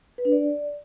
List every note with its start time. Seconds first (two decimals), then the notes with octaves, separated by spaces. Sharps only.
0.18 B4
0.25 D4
0.32 D5